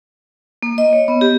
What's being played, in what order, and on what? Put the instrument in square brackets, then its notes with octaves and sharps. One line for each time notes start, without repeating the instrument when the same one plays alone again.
[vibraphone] A#3
D#5
C#5
B3
G4